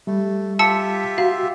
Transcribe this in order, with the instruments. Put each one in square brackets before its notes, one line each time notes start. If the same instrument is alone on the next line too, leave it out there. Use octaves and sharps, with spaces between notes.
[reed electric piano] G3 [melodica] A3
[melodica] F4 G4 E5 [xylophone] A5 E6 C#7
[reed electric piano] F#4 [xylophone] F5